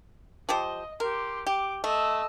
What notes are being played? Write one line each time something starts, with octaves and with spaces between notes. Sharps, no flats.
F3 G4 C5 D#5
G4 A#4 C6
G4 D6
A3 D#5 E6